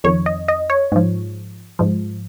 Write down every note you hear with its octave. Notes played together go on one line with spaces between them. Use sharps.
F2 D#3 C#5
D#5
D#5
C#5
G#2 F3
G#2 F3